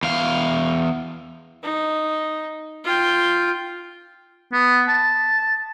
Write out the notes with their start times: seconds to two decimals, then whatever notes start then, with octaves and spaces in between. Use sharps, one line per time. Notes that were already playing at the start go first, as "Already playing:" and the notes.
0.03 E2 F5
1.63 D#4
2.85 F4 G5
4.53 B3
4.88 A5